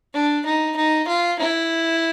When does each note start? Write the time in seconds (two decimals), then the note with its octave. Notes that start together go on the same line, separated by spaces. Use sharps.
0.13 D4
0.46 D#4
0.76 D#4
1.07 F4
1.39 E4